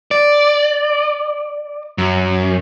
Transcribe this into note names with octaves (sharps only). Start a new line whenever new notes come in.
D5
F#2